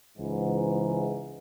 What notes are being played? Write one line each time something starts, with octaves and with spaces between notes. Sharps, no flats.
C#2 G#2 E3